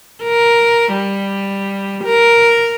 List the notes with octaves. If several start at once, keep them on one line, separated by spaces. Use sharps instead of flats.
A#4
G3
A#4